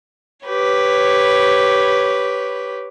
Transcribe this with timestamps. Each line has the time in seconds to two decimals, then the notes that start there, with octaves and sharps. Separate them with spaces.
0.46 G4 B4 C#5